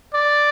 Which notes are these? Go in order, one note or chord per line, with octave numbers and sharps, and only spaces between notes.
D5